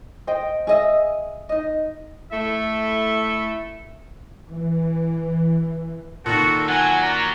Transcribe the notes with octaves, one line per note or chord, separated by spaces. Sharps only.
C5 D#5 G5
G#4 D#5 E5
D#4 D#5
A3 E4 A4 E5
E3
A#2 D#3 F#4 A4
F#3 F#5 G#5
C#4 D5 A#5